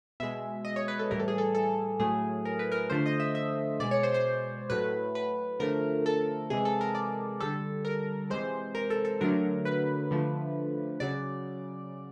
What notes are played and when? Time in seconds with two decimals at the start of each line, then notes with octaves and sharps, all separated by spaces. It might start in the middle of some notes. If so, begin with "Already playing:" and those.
0.20 B2 G#3 E5
0.65 D#5
0.76 C#5
0.88 B4
0.99 A4
1.11 A2 E3 G3 A#4
1.19 A4
1.28 G#4
1.38 A4
1.55 A4
2.00 A2 F#3 A3 G#4
2.45 A#4
2.59 B4
2.72 A#4
2.90 D3 F3 A3 C5
3.06 D#5
3.20 E5
3.35 E5
3.80 B2 G#3 D5
3.91 C#5
4.03 C5
4.14 C5
4.70 A2 F#3 A3 B4
5.15 B4
5.60 D3 F3 A3 A#4
6.06 A4
6.50 C3 E3 G#3 G#4
6.65 A4
6.81 A#4
6.95 D5
7.40 D3 G3 A4
7.85 A#4
8.30 C3 E3 G#3 C5
8.75 A#4
8.90 A4
9.05 A4
9.21 D3 F#3 A3 A#4
9.65 B4
10.11 D3 F3 A3
11.00 C#3 F#3 D5